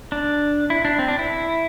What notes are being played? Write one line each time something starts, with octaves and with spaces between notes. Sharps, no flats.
D4
E4
D4
C4
D4
E4